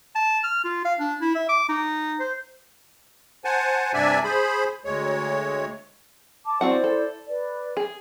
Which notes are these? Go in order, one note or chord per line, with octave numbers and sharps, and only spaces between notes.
A5
F6
F4
F5
D4
E4
E5
D6
D#4
C5
C5 F#5 G#5 A5
G2 C3 D4 D5 E5 G#5
G#4 C5 B5
D2 G#3 C#5
A5 D6
C4 E4 F#4 C5 D5 F#5
A4
B4 D5
G#4